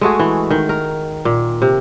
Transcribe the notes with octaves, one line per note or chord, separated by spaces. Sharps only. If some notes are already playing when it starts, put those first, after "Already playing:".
G#3 A3 F#4 G#4
E3
D#3
A#4
A#2
C3